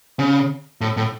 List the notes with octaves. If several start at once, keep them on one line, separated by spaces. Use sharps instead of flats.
C#3
A2
A2